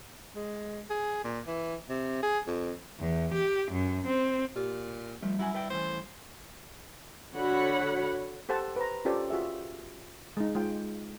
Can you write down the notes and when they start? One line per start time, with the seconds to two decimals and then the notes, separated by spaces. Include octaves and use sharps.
0.36 G#3
0.90 G#4
1.24 A#2
1.47 E3
1.89 C3
2.23 G#4
2.47 F2
3.00 E2
3.34 G4
3.72 F#2
4.07 C4
4.56 A#2 G4
5.22 F3 G3 A3
5.39 F#3 E4 F#4 G#5
5.54 B4 D5 G5
5.70 A2 C#3 E3 C5
7.36 D3 F#4 C#5 F#5 B5
8.49 G4 A4 C5 F#5 A5
8.76 B4 C5 A#5
9.05 C#4 F4 G4 A4 C5 D5
9.30 F4 F#4 G#4 E5
10.37 G#3 D#4
10.55 G#3 F4 G5